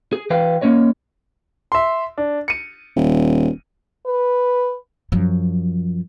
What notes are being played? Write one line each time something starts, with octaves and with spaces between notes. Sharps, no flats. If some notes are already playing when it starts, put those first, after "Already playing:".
G#4
E3 B4 F5 G5
A#3 B3 C#4 C#5 D#5
E5 C6
D4
C#7 D#7
D#1
B4
F#2 F3